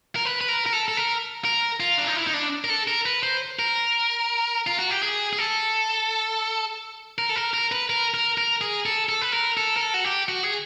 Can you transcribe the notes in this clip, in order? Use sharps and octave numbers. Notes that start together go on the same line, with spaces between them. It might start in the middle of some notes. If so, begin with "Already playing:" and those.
A#4
B4
B4
A#4
A#4
A4
A4
A#4
A#4
F4
D4
D#4
E4
D#4
D4
A#4
A4
A#4
B4
C5
A#4
F4
F#4
G4
G#4
G#4
A4
A#4
A4
A#4
A#4
B4
A#4
A#4
A#4
G#4
A4
A4
B4
A#4
A4
A#4
A4
F#4
G4
F#4
G#4